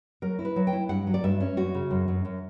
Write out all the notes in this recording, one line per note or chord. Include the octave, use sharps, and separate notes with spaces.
F#3 A#4
E4
B4
F#3
G5
E4
G2 F#5
F#3
D5
G2 E5
C#4
F#2 F#4
C#3
F#2
F#2
F#2